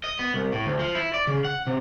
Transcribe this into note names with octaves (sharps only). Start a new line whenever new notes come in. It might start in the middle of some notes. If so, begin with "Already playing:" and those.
D#5
B3
C2
A2
D2
F3
E4
D5
C#3
F#5
C3